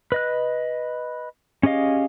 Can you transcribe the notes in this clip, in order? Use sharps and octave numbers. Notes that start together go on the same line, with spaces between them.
B4 D#5 F#6
C#4 G4 G#4 D#5 F5